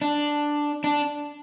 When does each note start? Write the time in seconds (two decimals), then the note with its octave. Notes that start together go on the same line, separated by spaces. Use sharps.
0.01 D4
0.84 D4